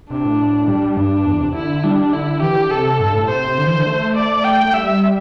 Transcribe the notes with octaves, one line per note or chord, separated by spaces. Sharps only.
C3 D4
A2
G3
G2 D4
E2
C3
D3 E4
G3 D4
D3 E4
E3 G4
D3
C3 A4
G2
A2
C3 C5
D3
E3
D3
A3
D5
G5
A3
G3 E5